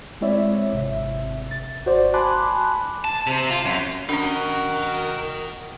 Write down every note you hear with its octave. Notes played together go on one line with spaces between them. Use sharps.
G#3 C4 E4 C#5 D5 E5
G#1 C3 E5
A6
G#1 F#4 C5 D5
G#5 A5 B5 C6 D6 F#6
A5
C3
F4
F#2
C#4 D4 F#4 A#4 D#5 G5